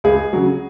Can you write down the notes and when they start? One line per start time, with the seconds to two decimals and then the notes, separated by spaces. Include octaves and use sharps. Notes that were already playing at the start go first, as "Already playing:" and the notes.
0.04 C#2 G#4
0.33 C#3 F#3